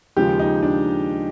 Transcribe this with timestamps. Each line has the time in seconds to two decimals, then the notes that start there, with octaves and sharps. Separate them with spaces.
0.16 D#2 C#3 F3 G#3 G4
0.39 D#4
0.63 D4